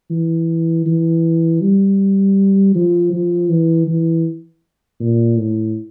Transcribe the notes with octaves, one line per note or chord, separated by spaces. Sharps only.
E3
E3
G3
F3
F3
E3
E3
A#2
A2